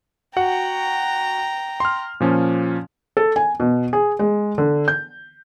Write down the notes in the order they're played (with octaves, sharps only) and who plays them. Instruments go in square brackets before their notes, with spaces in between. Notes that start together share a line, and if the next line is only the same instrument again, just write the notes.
[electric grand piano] F#4 F#5 F#6 [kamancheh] G5 A#5
[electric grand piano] C6 F6
A#2 F3 C#4
[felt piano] A4
G#5
B2
G#4
G#3
D3
G6